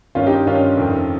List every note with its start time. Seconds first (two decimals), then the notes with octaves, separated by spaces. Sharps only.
0.15 G2 D#3 C#4 F4
0.26 D#4 G4
0.46 G2 D#3 C#4 F4
0.77 F2 C3 D#3